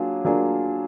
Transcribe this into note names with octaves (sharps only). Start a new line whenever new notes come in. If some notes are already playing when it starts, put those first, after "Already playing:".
Already playing: F#3 A#3 D4 F4 G#4
F#3 A#3 D4 F4 G#4